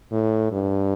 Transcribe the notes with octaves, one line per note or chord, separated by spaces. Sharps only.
A2
G2